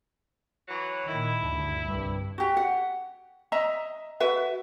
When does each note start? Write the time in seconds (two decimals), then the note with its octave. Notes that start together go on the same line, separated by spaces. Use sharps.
0.68 E3 F#3
1.07 A#2 D#3 E4
1.40 D2 G2 D3
1.85 C2 G2
2.38 F#4 G4
2.57 F#5
3.52 D#5 E5 A#5
4.20 F#4 B4 E5